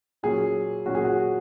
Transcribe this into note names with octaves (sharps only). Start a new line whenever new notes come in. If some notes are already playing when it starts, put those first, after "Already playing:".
A#2 F#3 C#4 G#4
A#2 F#3 C#4 F#4
G#4
F#4